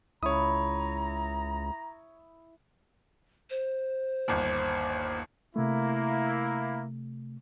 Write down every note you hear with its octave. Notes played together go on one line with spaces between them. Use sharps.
C#2 E4 C#5 A#5 D#6
C5
G1 D#2
C3 A3 A#3 E4